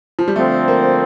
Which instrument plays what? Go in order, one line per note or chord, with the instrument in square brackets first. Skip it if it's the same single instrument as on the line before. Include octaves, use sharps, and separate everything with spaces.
[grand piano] F3
G3
[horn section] D3 F3 C4 [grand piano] A3
[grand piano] A#3